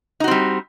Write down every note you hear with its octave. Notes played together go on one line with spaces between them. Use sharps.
G3 C4 D#4 F#4